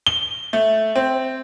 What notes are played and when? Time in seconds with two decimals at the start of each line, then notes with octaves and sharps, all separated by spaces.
0.07 G7
0.53 A3
0.96 C4